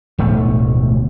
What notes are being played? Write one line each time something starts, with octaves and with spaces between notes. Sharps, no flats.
D1 B1 A3